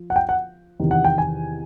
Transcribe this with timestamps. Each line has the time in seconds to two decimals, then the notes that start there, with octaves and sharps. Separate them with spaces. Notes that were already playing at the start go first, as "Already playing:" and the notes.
Already playing: F3
0.10 F#5
0.16 G5
0.29 F#5
0.80 E2 C3 D#3
0.91 F#5
1.04 G5
1.18 G#5